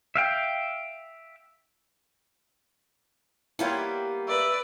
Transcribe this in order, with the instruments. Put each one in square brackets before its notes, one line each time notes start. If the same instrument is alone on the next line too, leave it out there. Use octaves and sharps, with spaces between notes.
[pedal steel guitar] E5 F5 G5
[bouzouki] G3 A#3 B3 [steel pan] E4 F4 C#5
[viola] B4 D5 [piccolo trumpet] E5